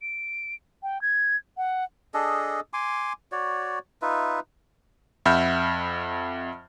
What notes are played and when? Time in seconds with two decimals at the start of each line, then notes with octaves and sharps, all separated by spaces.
0.02 D7
0.83 G5
1.02 G#6
1.57 F#5
2.14 D4 G#4 A4 D#5
2.73 G#5 C6 D6
3.32 F#4 C#5 D5
4.02 D#4 F4 B4 E5
5.26 F2 E5 F#5 B5 F6 G6